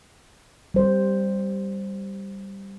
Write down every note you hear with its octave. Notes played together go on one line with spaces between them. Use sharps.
G3 C5